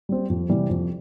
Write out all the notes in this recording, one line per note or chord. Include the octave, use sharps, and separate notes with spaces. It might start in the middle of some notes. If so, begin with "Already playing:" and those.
G3 C4
F2
C3 E3 G3
F2